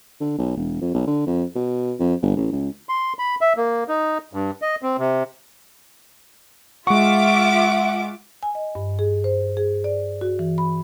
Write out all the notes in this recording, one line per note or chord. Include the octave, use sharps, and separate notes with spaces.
D3
B1
E1
F2
B1
D3
F2
B2
F2
G1
A1
C#2
C6
B5
E5
A#3
D#4
G2
D#5
C4
C3
G#3 F4 E5 F#5 C#6 D6
G#5
D#5
G2
G#4
C5
G#4
D5
F#4
E3
B5